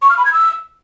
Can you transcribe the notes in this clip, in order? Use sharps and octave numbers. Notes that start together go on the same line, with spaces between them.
C#6
F6
B5
G#6
E6